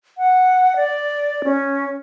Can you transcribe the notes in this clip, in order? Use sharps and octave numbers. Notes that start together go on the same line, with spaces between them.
F#5
D5
C#4